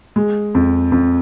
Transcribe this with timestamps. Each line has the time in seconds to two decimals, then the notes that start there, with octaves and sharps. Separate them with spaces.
0.16 G#3
0.55 F2
0.92 F2